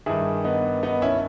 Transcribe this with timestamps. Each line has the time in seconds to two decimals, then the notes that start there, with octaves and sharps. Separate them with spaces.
0.06 G2 D#3 E4 G#4
0.44 B3 D#4
0.83 B3 D#4
1.02 C#4 E4